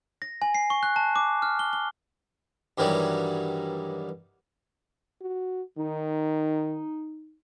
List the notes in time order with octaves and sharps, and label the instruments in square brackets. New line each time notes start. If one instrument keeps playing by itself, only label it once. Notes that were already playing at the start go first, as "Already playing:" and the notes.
[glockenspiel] A#6
G#5
C7
C#6
F#6
A5
D6
F6
G7
G7
[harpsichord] G2 D#3 E3 F#3 G3
[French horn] F#4
[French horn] D#3 [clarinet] D#4